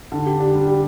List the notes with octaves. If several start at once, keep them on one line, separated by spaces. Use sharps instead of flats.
D3
G4
D4
G3
G4